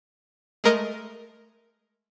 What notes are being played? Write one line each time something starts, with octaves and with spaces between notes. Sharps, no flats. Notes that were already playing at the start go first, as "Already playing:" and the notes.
G#3 A3 A#4 D#5